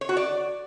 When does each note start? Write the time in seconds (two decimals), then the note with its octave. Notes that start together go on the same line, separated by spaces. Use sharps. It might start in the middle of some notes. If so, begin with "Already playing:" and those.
0.01 C#5
0.09 F#4
0.17 D5